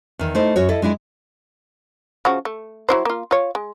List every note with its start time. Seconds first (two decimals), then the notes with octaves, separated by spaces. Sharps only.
0.19 E2 D#3
0.35 A3 D#4 E4 C5
0.56 F#2 F#4 C#5
0.69 E4 A4 D#5
0.82 G#3 D4 E4 G#4
2.25 C#3 F3 F#4
2.45 A3
2.89 F#3 E4 C5
3.05 A#3 F4
3.31 F4 C#5
3.55 G#3